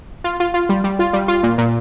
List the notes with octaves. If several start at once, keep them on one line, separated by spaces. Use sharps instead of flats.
F4
F4
F4
G3
G3
F4
G3
F4
A#2
A#2